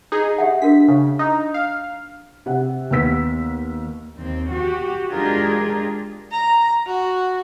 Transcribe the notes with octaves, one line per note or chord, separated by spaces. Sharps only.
D#4 G#4
G4 E5 F#5
D4 F#4 A#4 B6
C#3
D#4
F5
C3 G4 F#5
D#2 B3 E6 B6
D#2 C4
F#4 G4
G#3 D4 F4 G4 G#4 A#4
A#5
F#4